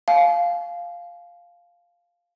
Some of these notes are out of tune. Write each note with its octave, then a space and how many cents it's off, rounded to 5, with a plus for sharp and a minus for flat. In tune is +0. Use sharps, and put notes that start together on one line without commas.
F5 +0 G#5 +45